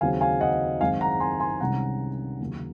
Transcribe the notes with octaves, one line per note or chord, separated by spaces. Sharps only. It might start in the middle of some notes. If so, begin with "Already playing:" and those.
D#2 C#3 F#3 C4 F5 G#5
F5 G#5
D#5 F#5
G#1 F#2 D#3 G#3 C4 F5 G#5
F#5 A#5
G#5 C6
G#5 C6
C2 C3 D#3 G#3 C#4 F#5 A#5
D#2 C#3 F#3 A#3